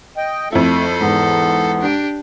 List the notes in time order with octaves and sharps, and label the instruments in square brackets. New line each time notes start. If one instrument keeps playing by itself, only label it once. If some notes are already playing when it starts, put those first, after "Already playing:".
[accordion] D#5 G5
[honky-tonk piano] F2 E4 [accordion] A3 [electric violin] A4 C5
[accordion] E2 B3 [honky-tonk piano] G#2
[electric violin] D4 G4